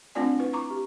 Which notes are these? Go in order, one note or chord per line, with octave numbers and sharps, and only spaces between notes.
A3 C4 D4 F4 D5 G#5
E4 B4
A#5 C#6 D6
G4